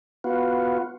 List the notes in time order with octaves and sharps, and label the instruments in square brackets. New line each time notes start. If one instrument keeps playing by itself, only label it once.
[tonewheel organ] B3 F4 F#4